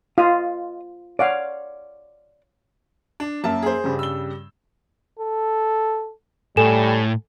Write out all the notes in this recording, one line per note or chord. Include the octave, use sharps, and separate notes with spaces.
F4 D#5 F5
C#5 D5 F5 F#5
D4
F#2 A#3 E5 A5
G#4 C5
G2 C#3 G3
E6 G7
A4
A2 G3 A4 G#5 E7